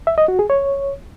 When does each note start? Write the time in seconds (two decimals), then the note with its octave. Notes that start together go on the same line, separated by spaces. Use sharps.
0.07 E5
0.18 D#5
0.28 F#4
0.39 G#4
0.50 C#5